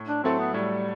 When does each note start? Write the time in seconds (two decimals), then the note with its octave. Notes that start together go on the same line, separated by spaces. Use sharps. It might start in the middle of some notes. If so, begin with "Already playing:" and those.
Already playing: A2
0.09 D4
0.24 F#3 A3 C4 E4 A4
0.39 B3
0.54 A2 G3